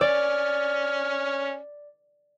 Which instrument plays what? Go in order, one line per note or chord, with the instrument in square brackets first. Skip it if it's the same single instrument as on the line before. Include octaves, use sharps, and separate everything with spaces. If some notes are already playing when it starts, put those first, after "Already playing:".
[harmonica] C#4 F6 [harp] D5